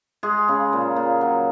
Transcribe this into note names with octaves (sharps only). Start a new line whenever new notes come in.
G#3 G#4
C#3
A#2
A#2
F#3